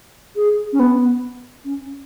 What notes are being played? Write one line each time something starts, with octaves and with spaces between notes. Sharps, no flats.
G#4
C#4
B3
C#4